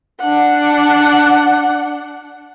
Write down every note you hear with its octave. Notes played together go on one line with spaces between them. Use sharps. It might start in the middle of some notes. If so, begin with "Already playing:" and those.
D4 F#5